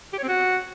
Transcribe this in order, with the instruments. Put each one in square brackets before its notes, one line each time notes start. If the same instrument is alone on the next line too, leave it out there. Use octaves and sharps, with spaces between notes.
[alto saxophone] G4
C#5
C4
F#4